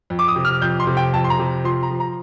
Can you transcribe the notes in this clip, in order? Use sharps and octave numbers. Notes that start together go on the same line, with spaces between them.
F2
D6
D#6
C3
F6
F2 G6
C6
C3
G5
F2 A5
C6
A#5
C3
F3 C6
A#5
F3
A#5